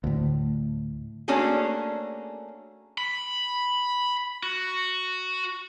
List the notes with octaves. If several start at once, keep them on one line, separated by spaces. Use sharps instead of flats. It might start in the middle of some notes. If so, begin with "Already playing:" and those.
D2 A2
A3 A#3 C#4 D4 F#4 G#4
B5
F#4